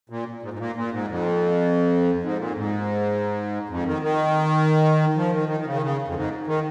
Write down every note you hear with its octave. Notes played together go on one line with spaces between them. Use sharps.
A#2
G#2
G#2
A#2
A#2
G#2
F2
G#2
A#2
F2
G#2
F2
D#3
D#3
F3
D#3
D#3
D#3
C#3
D#3
C#3
F2
G#2
D#3